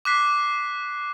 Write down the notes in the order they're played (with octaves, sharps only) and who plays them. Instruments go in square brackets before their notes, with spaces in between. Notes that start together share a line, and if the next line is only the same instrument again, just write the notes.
[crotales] D6 F#6 B6 C7